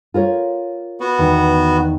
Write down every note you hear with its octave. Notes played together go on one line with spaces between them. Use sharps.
F4 A#4 C#5
B3 F#4
E2 D#3